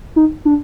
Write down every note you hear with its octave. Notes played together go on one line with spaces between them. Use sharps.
D#4
D4